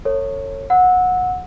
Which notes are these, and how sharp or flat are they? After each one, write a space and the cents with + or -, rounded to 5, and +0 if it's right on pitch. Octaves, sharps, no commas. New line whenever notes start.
A4 +45 C#5 -10
F#5 -20 E6 -15